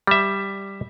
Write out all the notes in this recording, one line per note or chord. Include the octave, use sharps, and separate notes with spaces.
G3 E5